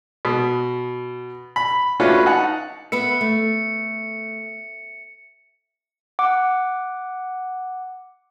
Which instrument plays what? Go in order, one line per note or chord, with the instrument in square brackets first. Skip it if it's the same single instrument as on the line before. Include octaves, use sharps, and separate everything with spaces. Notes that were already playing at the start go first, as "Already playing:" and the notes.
[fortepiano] B2
B5
A3 C#4 D4 F4 F#4 B4
D#4 F#5 A5
[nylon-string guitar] B3 B4 E5 [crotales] C#7
[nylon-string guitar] A3
[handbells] F#5 D6